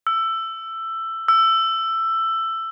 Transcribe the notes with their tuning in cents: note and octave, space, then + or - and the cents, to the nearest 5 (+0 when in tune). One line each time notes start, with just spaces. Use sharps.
E6 +15
E6 +15